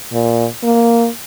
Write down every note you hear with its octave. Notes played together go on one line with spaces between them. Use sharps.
A#2
A#3